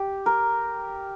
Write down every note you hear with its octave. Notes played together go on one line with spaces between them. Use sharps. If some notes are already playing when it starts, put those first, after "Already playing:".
Already playing: G4
A#4